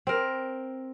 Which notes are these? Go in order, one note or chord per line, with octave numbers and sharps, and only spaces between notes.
C4 A#4